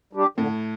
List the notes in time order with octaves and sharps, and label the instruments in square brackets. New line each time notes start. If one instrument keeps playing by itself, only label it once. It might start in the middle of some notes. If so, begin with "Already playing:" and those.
[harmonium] G3 D4 G4
[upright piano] A2 [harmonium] D3